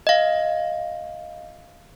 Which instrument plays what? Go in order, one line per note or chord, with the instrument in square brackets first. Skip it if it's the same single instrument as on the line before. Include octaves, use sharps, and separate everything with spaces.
[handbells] D#5 F5